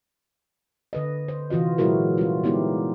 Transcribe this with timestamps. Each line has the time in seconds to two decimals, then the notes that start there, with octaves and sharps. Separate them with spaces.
0.93 D3 B4 D#5
1.28 C5
1.50 C3 E3 F4 F#4 D#5
1.78 A#2 F#3 G#3 E4 F#4 A#4
2.18 G3 C#4 F4
2.44 G3 G#3 B3 D#4 E4 G4